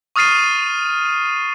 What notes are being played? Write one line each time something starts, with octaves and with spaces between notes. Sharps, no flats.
C#6 D#6 F6 A6 C7 D#7